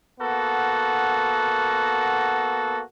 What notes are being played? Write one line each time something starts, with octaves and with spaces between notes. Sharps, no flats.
A#3 B3 F#4 A4